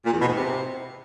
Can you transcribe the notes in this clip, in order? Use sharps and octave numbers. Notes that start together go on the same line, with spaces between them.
A#2
E2
B2
G#2
C3